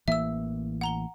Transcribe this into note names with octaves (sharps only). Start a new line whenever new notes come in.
A1 E3 A#3 E5 E6
F#5 A#5 G7